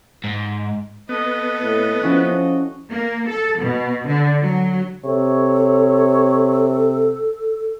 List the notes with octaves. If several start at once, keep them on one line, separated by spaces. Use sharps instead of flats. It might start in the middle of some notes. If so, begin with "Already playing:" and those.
G#2
B3 A4 D#5
A2
F3 C#4 E4 F#4
A#3
A4
B2
D3
F#3
C3 A4 C#5